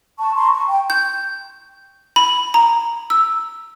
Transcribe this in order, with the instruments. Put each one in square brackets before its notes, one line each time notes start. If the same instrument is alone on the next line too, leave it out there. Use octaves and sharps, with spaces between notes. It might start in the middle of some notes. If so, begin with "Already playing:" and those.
[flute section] A5 C#6
A#5 C6 C#6
C#6
G5
[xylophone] G6
B5
A#5
E6